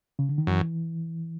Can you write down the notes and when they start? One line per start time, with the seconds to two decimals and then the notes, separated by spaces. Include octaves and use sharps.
0.19 C#3
0.29 D3
0.38 D#3
0.47 F#2 E3